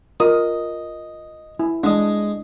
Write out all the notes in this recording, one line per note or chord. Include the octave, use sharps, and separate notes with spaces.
F4 A#4 D#5 D#6
E4
G#3 D4 D#5